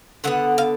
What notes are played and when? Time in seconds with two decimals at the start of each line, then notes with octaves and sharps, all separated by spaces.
0.24 D3 G#3 B3 F#5
0.58 F5